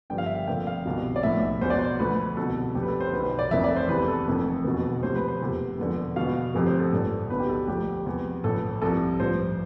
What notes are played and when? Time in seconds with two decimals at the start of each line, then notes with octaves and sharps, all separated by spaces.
0.10 G1 G2 D3 F3 G5
0.18 F5
0.26 E5
0.35 F5
0.47 F1 F2 D3 G5
0.67 F5
0.85 C2 B2
1.16 D5
1.23 B1 A2 F3 E5
1.61 E2 C5
1.66 B2 D5
1.79 C5
1.99 D2 D3 F3 B4
2.37 C2 B2 A4
2.75 F1 F2 D3 G4
2.83 B4
2.88 A4
3.00 C5
3.13 B1 B2 B4
3.25 C5
3.39 D5
3.51 F1 F2 E3 E5
3.64 D5
3.76 C5
3.89 E2 C3 E3 B4
4.08 A4
4.27 F1 F2 E3
4.64 F1 E2 B2
5.03 D2 C3 F3 C5
5.15 B4
5.28 C5
5.41 F1 E2 C3 F3
5.78 E1 E2 D3 F3
6.16 E2 B2 F5
6.54 F1 F2 C3 F3
6.66 C5
6.79 A4
6.92 A1 G2 D3 F3 A4
7.30 B1 B2 B4
7.40 G4
7.49 A4
7.68 D2 D3 F3 G4
8.06 E2 C3 F3
8.44 A1 A2 F3 A4
8.82 C2 C3 F3 A4
9.20 A1 G2 F3 C5